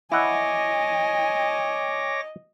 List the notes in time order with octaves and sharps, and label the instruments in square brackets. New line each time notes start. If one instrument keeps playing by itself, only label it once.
[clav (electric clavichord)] E4 F#5 [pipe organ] C#5 D6 A#6 [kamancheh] D#5 [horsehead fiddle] G#5